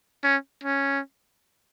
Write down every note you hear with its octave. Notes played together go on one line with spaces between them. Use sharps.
C#4
C#4